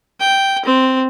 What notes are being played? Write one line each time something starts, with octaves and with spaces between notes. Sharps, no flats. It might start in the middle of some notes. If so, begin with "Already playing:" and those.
G5
C4